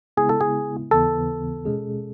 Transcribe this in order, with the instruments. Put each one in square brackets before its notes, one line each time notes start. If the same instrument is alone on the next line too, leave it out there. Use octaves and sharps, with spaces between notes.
[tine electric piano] C#3 G#3 B3 E4 [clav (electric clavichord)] G#4
[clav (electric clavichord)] A4
G#4
[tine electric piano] D#2 C#3 E3 B3 [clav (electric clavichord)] A4
[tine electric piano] B2 G#3 C#4 G#4